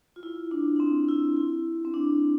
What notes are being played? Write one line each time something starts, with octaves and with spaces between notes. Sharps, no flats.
F4
E4
D4
D4
C4
E4
E4
C4
D4